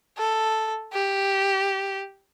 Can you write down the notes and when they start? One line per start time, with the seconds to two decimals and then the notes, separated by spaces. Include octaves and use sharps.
0.18 A4
0.93 G4